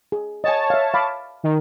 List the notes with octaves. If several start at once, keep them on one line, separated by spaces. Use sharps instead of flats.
G#4
C#5 D#5 F#5 G#5 A5
E5 F5
F5 B5 D6
D#3